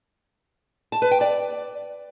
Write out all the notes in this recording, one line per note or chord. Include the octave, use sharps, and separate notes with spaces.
A5
B4
G5
D5